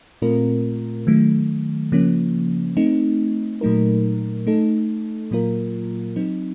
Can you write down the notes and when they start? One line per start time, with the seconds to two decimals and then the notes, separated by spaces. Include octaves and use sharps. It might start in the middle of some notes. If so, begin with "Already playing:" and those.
0.22 A#2 A3 C4 F4 A#4
1.07 D#3 F#3 A3
1.92 C#3 F3 A#3 C#4
2.77 A3 C4 D#4
3.61 A#2 F#3 A3 D#4 A#4
4.47 A3 D#4 A4
5.31 A#2 F#3 A#3 F4 A#4
6.16 F#3 C4 D#4